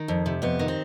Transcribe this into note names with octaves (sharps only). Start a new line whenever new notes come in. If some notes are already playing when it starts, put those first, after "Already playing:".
Already playing: D#3
F2
C3
F2 B3
D#3
C4